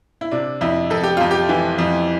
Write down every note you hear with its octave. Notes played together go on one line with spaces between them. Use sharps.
E4
C3 D4
F2 E4
F2 A4
G4
F2 F4
G4
E3
F2